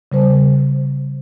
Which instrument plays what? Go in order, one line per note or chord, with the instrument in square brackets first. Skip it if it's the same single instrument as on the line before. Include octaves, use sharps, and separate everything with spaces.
[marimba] C#3 G3 C5